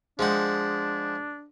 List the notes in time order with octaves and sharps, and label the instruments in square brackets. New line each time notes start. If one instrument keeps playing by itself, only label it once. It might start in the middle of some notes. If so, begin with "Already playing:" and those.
[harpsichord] F3 G#3 F#5 [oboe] D4 [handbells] G#4 G6